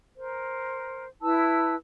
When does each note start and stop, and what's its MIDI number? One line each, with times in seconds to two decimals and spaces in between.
0.16 1.06 70
0.16 1.06 72
1.22 1.75 64
1.22 1.75 71
1.22 1.75 81
1.22 1.75 88